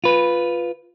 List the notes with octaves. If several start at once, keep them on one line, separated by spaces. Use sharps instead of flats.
F4 B4